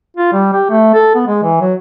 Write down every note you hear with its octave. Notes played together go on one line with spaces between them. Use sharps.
F4
G3
G4
A3
A4
B3
G#3
E3
F#3